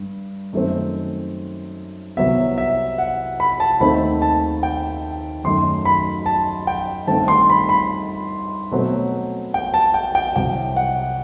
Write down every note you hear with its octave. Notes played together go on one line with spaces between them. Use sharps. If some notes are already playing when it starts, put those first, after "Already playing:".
Already playing: G2
F#2 D#3 A3 C4
C2 C3 F#3 B3 E5
E5
F#5
B5
A5
D#2 D#3 A3 C4 B5
A5
G5
F#2 D#3 F#3 A3 C6
B5
A5
G5
G2 D#3 A3 C4 A5
C6
B5
B5
B2 F#3 A3 C4
G5
A5
G5
G5
C2 C3 F#3 G5
F#5